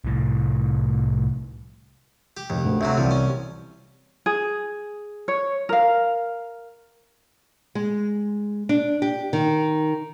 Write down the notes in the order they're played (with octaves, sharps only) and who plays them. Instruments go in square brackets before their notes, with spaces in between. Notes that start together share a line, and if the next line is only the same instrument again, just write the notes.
[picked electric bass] C2 A2
[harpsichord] G4
[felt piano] F1 [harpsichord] D#2
[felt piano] D2
[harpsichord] D2 C3 F#3 [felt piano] E5
[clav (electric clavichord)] C2 G3 [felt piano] E3 C4 [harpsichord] F3
[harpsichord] C#4
[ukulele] G#4
C#5
A#4 F5
[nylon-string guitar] G#3
D4
G4
D#3